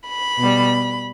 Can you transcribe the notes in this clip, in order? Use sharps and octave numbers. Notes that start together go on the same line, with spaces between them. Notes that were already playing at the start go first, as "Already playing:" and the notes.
B5
B2 G3